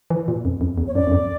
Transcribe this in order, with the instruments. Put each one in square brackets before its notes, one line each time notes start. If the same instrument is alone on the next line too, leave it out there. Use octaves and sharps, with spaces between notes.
[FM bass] E3
A#2
F2
F2
E2
[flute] C#5
[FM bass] F#2 [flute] D5
[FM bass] F#2
F2